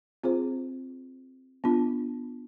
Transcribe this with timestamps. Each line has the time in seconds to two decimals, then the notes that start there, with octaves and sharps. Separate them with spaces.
0.24 C4 F4 G#4 C5
1.64 B3 D4 F4